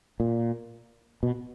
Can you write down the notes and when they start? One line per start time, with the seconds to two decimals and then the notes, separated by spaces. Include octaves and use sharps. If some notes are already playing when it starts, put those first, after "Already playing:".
0.20 A#2
1.23 B2